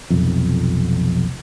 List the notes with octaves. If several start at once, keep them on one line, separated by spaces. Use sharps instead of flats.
F1 B1 F2